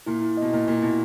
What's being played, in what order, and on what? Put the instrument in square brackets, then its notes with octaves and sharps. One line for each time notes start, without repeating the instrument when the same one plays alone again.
[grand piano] A#2 [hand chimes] E4
[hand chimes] E4
[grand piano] B2 [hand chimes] D#5
[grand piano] A#2 [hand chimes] E4
[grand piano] A#2 [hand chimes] E4
[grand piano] B2 [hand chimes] E4